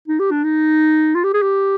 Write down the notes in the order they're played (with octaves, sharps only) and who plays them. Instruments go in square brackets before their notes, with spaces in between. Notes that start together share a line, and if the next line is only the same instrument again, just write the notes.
[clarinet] D#4
G4
D4
D#4
F4
G4
G#4
G4